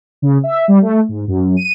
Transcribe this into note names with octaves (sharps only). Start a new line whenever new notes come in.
C#3
E5
G3
A3
G#2
F#2
D#7